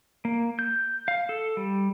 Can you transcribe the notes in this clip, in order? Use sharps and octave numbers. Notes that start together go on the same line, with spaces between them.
A#3
G6
F5
A4
G3